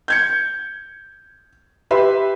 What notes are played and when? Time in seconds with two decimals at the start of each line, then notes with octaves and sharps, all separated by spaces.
0.08 G6 G#6 C#7
1.91 G4 B4 E5 C6